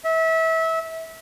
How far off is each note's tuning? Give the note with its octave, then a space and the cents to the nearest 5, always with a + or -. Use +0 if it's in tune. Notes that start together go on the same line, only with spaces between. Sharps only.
E5 -25